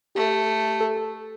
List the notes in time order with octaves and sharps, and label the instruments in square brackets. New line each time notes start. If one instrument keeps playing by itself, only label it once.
[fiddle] A3 [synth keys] G4
[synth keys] A4
A4